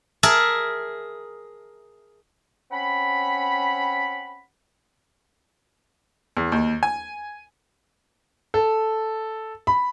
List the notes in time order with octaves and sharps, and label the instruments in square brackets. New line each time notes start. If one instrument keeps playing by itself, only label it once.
[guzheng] G#4 A#4 E5 A5
[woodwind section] C4 C#4 F#5 B5
[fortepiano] E2
D#2
G#5
[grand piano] A4
B5